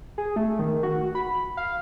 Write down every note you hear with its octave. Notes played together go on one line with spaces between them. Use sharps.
G#4
A3
D#3
F#4
B5
F5